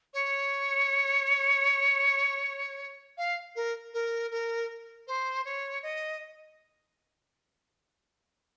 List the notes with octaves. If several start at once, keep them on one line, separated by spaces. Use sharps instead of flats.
C#5
F5
A#4
A#4
A#4
C5
C#5
D#5